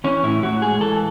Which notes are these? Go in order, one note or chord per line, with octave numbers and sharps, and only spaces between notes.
E3 C#4
A2 E4
A2 F#4
G#3 G#4
E3 A4